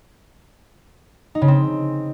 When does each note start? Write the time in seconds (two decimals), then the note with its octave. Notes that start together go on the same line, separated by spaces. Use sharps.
1.35 D#4
1.42 C#3
1.48 C4